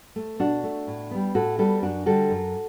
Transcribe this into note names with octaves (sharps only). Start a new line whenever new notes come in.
A3
B2 D4 F#4
A3
A2
G3 B3
A2 F#4 A4
G3 B3 F#4 A4
F#2 D4 F#4
D3 G3 F#4 A4
F#2